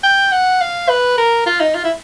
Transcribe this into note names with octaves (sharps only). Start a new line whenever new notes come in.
G5
F#5
F5
B4
A#4
F4
D#4
F4
E4